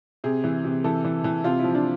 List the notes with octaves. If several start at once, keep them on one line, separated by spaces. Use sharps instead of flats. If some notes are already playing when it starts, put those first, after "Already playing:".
C3 G#4
E3
C3
E3 A4
E3
E3
C3 F4
F3 E4
D4